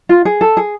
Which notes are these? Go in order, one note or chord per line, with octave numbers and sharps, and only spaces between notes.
F4
G#4
A4
G#4